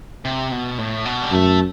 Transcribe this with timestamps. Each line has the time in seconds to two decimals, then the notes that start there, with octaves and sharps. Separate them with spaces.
0.25 C3
0.52 B2
0.78 A2
1.05 B2
1.22 G3
1.32 F#2 A3